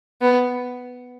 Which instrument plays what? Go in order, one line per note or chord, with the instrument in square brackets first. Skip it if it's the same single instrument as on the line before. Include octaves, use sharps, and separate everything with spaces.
[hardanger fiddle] B3